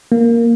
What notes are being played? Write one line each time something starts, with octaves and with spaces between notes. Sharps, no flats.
A#3